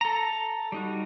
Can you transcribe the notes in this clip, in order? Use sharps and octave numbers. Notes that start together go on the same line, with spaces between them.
A4 A#5
G3 D#4 F#4